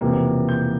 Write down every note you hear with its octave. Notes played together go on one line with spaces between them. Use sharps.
E1 E2 C3 F3 A#3
G6